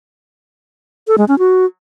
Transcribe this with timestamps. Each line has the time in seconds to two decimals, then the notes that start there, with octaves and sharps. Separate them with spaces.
1.07 A4
1.18 G#3
1.28 C#4
1.39 F#4